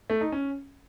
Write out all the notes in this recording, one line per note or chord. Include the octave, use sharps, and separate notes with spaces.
A3
D#4
C#4